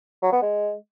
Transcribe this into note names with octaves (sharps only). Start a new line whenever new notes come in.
F#3
B3
G#3